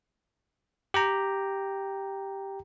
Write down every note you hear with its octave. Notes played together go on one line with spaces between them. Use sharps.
G4 G5 A#5